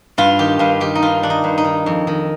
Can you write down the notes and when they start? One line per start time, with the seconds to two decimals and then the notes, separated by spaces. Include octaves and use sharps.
0.18 G2 F4
0.39 D#3 G4
0.59 G2 F4
0.80 D#3 G4
0.95 D#4
1.02 G2 F4
1.23 D#3 D4
1.30 D#4
1.44 G2
1.58 D#4
1.65 D#3
1.86 F2
2.07 D#3